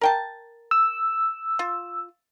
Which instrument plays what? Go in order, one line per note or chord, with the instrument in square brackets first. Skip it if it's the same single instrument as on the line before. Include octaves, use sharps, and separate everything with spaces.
[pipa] A#4 G5 A5
[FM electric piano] E6
[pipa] F4